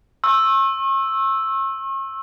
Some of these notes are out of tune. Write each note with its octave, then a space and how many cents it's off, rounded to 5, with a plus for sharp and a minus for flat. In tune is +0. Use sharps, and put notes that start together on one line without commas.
C#6 -40 E6 +0